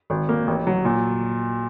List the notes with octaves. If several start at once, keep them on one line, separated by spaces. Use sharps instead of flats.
G#1
A#3
A1
F#3
A#2